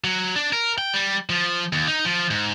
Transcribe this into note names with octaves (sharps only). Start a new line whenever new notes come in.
F#3
D4
A#4
G5
G3
F3
D#2
D#4
F3
G#2